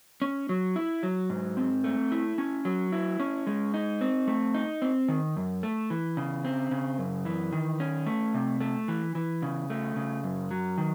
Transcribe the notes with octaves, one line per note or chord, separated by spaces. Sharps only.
C#4
F#3
E4
F#3
G#2
C4
A3
E4
C#4
F#3
E4
C#4
G#3
D#4
C4
A3
D#4
C4
D#3
F#2
A3
E3
C#3
C4
C#3
F#2
E3
D#3
C#4
A3
C3
A3
E3
E3
C#3
A3
C#3
F#2
F#3
D#3